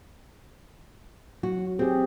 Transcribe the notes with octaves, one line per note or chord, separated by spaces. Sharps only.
F#3 F#4
C4 G4 G#4